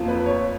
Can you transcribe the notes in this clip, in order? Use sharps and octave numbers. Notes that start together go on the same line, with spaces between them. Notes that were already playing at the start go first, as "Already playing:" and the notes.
Already playing: F2 F3 A#3
B4
C#5